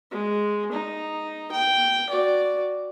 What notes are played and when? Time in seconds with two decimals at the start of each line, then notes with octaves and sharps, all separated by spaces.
0.11 G#3
0.72 D#4
1.51 G5
2.09 F#4 D5